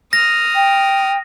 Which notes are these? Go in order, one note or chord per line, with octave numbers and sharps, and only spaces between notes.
D#6 F6 A#6
G5